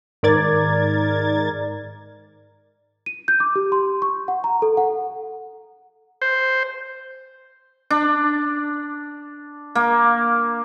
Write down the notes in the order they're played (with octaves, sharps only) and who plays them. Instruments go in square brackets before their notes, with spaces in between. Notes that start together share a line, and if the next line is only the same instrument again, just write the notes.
[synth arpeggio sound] G#2 D#3 A#4 D5 G#6 A6
[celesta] D#7
G6
D6
G4
C6
C#6
F#5
A#5
A4
F#5
[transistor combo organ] C5
[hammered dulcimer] D4
A#3